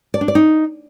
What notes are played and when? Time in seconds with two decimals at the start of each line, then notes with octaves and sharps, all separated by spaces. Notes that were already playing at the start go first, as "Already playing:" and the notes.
0.14 D5
0.21 D4
0.28 D5
0.35 D#4